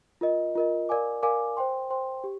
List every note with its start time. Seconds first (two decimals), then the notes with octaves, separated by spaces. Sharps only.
0.21 F4 A#4 D#5
0.56 F4 A#4 D#5
0.89 A#4 D5 F5 G#5 D6
1.23 A#4 D5 F5 G#5 D6
1.57 C5 G5 C6
1.90 C5 G5 C6
2.24 G4